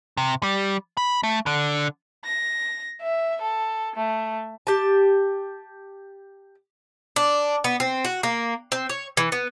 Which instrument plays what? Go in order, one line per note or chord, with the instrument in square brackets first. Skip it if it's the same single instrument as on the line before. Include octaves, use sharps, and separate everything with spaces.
[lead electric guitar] C3
G3
B5
A3
D3
[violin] A#6
E5
A4
A3
[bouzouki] G4 A5
D4
B3
C4
F#4
A#3
C4
C#5
E3
B3